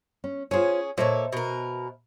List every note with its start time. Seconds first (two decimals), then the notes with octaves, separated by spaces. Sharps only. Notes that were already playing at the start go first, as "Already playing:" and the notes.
0.24 C#4
0.51 C#4 F4 G#4 C5 C#5
0.98 A#2 A4 C5 C#5 D#5 E5
1.33 B2 A#4